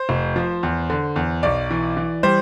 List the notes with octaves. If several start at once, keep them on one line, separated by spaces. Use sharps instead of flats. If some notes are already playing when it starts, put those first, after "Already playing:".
Already playing: C5
F1
F3
E2
D3
E2
B1 D5
E3
E3
G3 C5